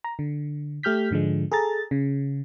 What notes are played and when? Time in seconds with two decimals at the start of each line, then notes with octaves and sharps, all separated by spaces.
0.04 A#5
0.19 D3
0.83 A3 G4 F6 G6 B6
1.11 G#2 D3 F3 G#3
1.52 G#4 A4 A#5 A6
1.91 C#3